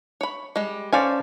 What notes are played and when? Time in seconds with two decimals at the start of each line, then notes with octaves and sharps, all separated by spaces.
0.21 C#5 B5
0.56 G3 G#3
0.93 C#4 A4 C5 D5 F5 G#5